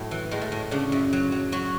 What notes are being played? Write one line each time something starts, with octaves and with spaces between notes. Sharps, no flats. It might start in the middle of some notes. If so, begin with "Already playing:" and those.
Already playing: A2 F#3 A3
E3
A2 G#3
A3
A2
C#3 D4
F#2
F#3
F#3
F#3 F#4